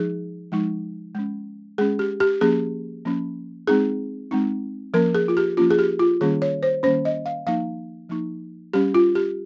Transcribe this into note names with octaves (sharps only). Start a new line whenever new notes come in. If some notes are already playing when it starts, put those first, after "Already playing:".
Already playing: F3 G#3 D#4 G#4
F3 G#3 D#4
G#3 C#4
G#3 C#4 G#4
G4
G4
F3 A#3 C#4 G#4
F3 A#3 C#4
G#3 C4 D#4 G#4
G#3 C4 D#4
F3 A#3 C#4 A#4
G#4
F4
G4
F3 A#3 C#4 F4
G#4
G4
F4
D#3 G3 A#3 C#4 G#4
C#5
C5
D#3 G3 A#3 C#4 C5
D#5
F5
F3 A#3 D#4 F5
F3 A#3 D#4
G3 C#4 G4
F4
G4